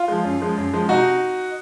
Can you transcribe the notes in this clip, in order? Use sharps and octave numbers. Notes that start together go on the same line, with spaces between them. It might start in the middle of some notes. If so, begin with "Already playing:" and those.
Already playing: F4
F3 G#3
F#2
F3 G#3
F#2
F3 G#3
C3 D#4 F#4